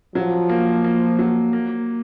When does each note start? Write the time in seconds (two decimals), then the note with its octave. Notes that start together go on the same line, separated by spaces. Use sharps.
0.15 F3 F#3
0.49 A#3
0.84 A#3
1.19 F#3
1.53 A#3